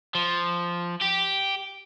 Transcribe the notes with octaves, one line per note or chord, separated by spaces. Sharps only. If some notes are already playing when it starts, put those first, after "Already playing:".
F3
G4